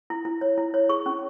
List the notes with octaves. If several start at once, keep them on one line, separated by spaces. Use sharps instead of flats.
E4
E4
C#5
E4
C#5
G#4 C#6
C#4